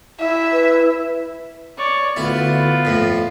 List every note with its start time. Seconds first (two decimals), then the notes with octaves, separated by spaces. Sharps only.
0.20 E4 E5
0.52 B4
1.78 C#5 D5
2.16 D2 B3 E4 F4
2.85 F2 A2